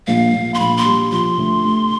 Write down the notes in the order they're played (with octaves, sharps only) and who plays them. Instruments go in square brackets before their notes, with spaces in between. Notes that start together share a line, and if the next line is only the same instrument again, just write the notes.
[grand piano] A#1 [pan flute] F5
[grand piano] A#1
[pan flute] C6
[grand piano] A#1 [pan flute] B5
[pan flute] C6
[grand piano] G3
[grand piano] F3 [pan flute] C6
[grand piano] D2
A3